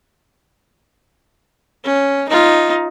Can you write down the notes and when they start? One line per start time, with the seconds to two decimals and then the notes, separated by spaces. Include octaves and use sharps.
1.84 C#4
2.28 D#4 F4